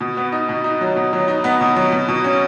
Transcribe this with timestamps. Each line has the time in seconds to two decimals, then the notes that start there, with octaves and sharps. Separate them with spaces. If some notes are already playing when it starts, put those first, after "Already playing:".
0.01 B2
0.17 B3
0.32 D#4
0.49 B2
0.64 D#4
0.81 F#3
0.96 B2
1.13 F#3
1.28 D#4
1.44 B3
1.61 B2
1.76 F#3
1.92 B2
2.08 B2
2.24 C#4